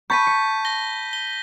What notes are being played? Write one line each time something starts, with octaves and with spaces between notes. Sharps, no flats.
A5 B5 C#6 G6 B6 D#7
C#7
A#6 G7
G7